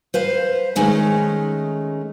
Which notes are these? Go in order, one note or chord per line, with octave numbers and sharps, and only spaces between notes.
B4 C5 F5
D#3 G#3 A3 C#4 D#4